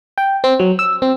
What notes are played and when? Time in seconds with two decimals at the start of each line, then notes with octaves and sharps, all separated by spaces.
0.18 G5
0.44 C4
0.60 F#3
0.79 E6
1.02 C4